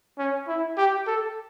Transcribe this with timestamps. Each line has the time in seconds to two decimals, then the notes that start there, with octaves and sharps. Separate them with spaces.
0.18 C#4
0.48 E4
0.78 G4
1.07 A4